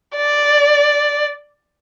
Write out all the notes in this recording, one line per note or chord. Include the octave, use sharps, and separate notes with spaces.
D5